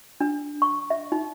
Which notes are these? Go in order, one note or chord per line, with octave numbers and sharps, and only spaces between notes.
D4
C#6
E5
D#4